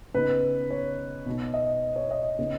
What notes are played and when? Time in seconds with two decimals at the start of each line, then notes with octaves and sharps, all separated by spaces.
0.14 C#3 B3 D#4 B4
0.70 C#5
1.26 B2 B3 D#4
1.54 D#5
1.96 C#5
2.11 D#5
2.38 C#3 B3 D#4